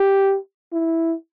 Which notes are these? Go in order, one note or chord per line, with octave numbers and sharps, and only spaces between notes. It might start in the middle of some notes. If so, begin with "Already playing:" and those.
Already playing: G4
E4